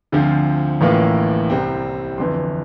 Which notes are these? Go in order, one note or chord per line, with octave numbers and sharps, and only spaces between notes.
D2 D3 F3 C4 F4
A1 A2 E3 A#3 F4
C2 C3 G3 C4
G1 F2 E3 C6